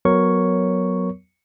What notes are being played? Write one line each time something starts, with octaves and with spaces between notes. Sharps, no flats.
F#3 B3 A#4 C#5 C#6